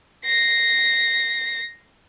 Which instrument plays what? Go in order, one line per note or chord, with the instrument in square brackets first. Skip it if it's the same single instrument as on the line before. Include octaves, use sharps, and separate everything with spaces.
[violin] A#6 C7